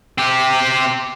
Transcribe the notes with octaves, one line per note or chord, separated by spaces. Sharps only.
C4 G4